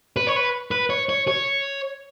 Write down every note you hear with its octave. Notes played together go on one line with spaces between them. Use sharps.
B4
C#5
B4
B4
C#5
C#5
C#5